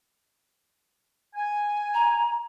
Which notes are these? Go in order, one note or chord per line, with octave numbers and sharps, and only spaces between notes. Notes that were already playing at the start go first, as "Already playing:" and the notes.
G#5
A#5